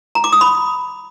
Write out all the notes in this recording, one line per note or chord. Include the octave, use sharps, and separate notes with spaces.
A#5
D6
D#6
B5